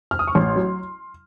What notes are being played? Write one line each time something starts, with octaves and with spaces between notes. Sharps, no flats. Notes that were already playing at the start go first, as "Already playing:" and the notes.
F6
D#6
C#6
A1 C6
F#3